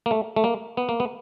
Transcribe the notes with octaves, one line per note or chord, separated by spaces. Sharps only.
A#3
A3
A3
A#3
B3
A#3
B3